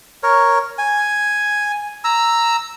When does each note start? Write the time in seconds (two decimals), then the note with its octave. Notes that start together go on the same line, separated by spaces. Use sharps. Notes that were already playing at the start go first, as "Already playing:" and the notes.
0.23 A#4 C#5
0.78 G#5
2.04 A#5 E6